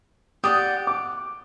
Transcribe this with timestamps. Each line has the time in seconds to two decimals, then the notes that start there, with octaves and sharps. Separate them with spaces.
0.44 G4 D5 F#5 D#6
0.87 D6